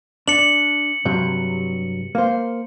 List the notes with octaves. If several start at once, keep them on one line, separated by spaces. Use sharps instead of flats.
D4 C#7 F#7
G2 C3 F#3
A#3 C5